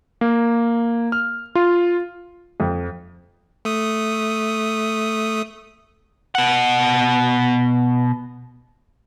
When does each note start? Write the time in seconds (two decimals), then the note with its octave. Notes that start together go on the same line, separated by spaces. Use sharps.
0.21 A#3
1.12 F6
1.55 F4
2.60 F2
3.65 A3 D#6
6.35 B2 F#5